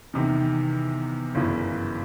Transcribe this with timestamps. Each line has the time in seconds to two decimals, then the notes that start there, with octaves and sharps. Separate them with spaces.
0.13 E2 C3 D#3
1.35 G1 F#2 C#3 E3